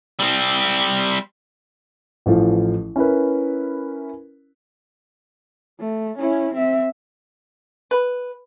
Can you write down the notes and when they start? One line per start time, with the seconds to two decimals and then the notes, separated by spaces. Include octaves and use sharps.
0.20 G3 C4
2.26 A1 E3 F3 A4
2.96 C#4 E4 A#4 B4
5.79 A3
6.18 C#4 E4
6.54 C4 E5
7.91 B4